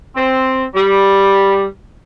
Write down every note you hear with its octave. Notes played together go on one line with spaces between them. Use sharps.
C4
G3